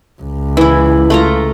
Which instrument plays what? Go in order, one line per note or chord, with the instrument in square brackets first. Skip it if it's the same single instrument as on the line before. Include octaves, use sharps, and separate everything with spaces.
[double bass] C#2
[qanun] E3 E4
A3 F4 A#5